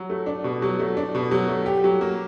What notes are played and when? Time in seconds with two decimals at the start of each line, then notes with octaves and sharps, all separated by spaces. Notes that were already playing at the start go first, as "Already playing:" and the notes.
Already playing: F#3
0.10 A3
0.26 D4
0.44 B2
0.62 F#3
0.79 A3
0.97 D4
1.15 B2
1.31 F#3
1.48 A3
1.66 G4
1.84 F#3
2.01 A#3